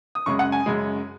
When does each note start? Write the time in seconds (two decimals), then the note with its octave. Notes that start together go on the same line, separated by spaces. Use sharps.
0.15 D#6
0.26 F#2 C#3 G#3 C#6
0.39 F#5
0.52 G#5
0.66 F#2 C#3 G#3